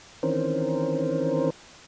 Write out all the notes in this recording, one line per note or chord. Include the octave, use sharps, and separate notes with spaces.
D#3 E3 C4 C#4 A#4 C5